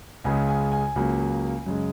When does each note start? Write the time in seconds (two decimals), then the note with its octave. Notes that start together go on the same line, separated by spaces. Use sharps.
0.24 C#2 C#3 G#3 G#5
0.48 G#5
0.72 G#5
0.96 C#2 C#3 F#3 A#3
1.66 F#2 C#3 G#3